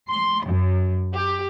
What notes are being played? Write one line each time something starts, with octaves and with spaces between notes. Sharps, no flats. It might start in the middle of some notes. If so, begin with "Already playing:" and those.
C6
F#2
G4